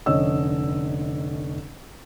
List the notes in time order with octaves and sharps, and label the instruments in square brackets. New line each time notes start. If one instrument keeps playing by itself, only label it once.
[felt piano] F1 D3 C#4 C#5 D#5 E6